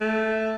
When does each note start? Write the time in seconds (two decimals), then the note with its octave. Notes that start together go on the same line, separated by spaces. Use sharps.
0.01 A3